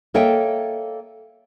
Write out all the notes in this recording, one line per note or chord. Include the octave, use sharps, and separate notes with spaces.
A#3 A4 C#5 D#5 E5 G5